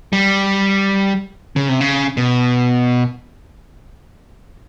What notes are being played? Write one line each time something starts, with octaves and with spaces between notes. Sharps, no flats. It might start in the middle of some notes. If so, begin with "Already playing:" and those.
G3
C#3
C3
C#3
B2